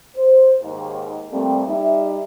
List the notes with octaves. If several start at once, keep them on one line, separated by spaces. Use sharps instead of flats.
C5
D#2 G#2
F2 A#2 G3 A3 A#3 C4
G3 D#4 E5